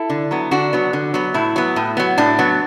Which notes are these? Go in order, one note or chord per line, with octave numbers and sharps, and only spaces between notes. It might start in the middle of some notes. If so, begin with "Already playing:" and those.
Already playing: E4 A4
D3
F#3 B3
D3 D4 F#4
F#3 B3
D3
F#3 B3
A2 E4
F#3 B3
A2
F#3 B3
A2 D4
F#3 B3